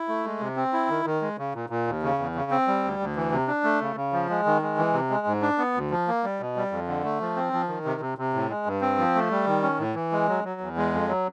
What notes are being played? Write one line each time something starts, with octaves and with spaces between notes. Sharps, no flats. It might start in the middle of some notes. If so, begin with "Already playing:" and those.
Already playing: E4
A3
G#3
C3
C4
E4
D#3
D#3
G#3
C#3
A#2
A#2
D#2
C#3
E2
C#3
C4
G3
D2
D2
E3
C3
D4
A3
C#3
C#3
F3
G#3
D#3
G#3
E3
C3
G#3
G#2
D4
B3
D2
F3
A#3
G3
B2
G3
F2
D3
A3
F3
C4
F3
D#3
C3
C3
C3
A2
G#3
G2
C4
F3
A3
G3
D#3
C#4
A2
E3
G#3
F#3
F#3
E2
G#3
F2
F#3